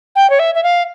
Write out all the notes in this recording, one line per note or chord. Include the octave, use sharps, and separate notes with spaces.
G5
C#5
E5
E5
F5